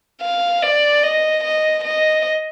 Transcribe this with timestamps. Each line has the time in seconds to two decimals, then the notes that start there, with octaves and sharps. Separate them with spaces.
0.22 F5
0.63 D5
1.04 D#5
1.44 D#5
1.84 D#5